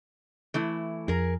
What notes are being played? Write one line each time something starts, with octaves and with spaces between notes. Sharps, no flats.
E3 A3 E4
F2 G#4 A#4